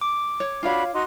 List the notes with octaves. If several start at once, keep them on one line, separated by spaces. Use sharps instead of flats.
D6
C#5
D4 F4 F#4 C#5 F5 B5
D#4 F#4 C6